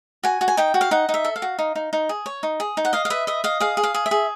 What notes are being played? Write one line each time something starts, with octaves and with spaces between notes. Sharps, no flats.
F#4 G#5
F#4
G#5
D#4 G5
F#4
F5
D#4 F#5
D#4
E5
A4
F5
F#4
D#4
D#4
D#4
G#4
C#5
D#4
G#4
D#4
F#5
D#5 F5
F5
B4 E5
D#5 E5
D#5 F5
G#4 F5
G#4
F5
G#4
E5
G#4